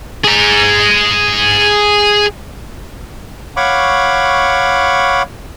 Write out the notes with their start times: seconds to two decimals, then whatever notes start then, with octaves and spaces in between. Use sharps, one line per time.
0.25 G#4 A#5
3.57 C#5 F5 F#5 B5 C#6 D6